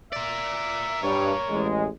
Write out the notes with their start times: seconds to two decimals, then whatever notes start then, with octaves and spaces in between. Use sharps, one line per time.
0.12 A#4 D5 E5
1.03 G2 C#5
1.50 A1 G#3